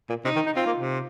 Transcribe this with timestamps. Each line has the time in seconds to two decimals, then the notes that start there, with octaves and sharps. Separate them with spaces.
0.09 A#2
0.25 C3 D#4
0.35 D#3
0.46 D#4
0.55 C4 F4
0.66 A#3
0.77 C3